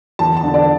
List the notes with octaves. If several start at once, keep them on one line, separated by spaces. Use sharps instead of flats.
E2 A5
A5
D3
D5